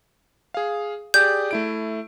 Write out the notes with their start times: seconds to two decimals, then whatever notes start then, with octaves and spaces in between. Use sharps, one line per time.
0.54 G#4 F5
1.14 G4 G#4 D5 G6
1.51 A3 E4 D7